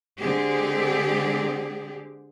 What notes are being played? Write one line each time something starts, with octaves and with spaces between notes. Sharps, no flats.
D3 G#3 C4 G4 G#4